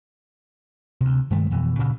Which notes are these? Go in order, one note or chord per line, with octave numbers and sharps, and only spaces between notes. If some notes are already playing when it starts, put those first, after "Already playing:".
D2 C3
G2 D#3 G#3 A3
F2 B2 E3
D2 A#2 C#3